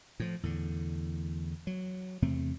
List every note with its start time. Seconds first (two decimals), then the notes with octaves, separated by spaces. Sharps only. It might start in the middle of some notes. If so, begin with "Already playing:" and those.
0.20 A2 F3
0.43 E2 A2 D3
1.67 F#3
2.22 E2 C3 A3 C4